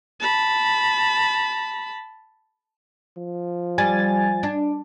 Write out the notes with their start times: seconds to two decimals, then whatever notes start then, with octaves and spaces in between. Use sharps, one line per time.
0.20 A5 B5
3.18 F3
3.78 G3 G#5 A6
4.43 D4